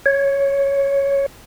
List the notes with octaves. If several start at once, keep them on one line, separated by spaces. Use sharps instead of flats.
C#5